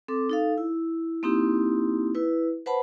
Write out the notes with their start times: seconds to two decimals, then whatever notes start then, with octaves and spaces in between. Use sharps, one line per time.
0.08 C4 A4 D6
0.29 D#4 A4 F5
0.58 E4
1.23 A#3 C4 D#4 E4 G4
2.15 E4 B4
2.66 B4 C5 F#5 A5 B5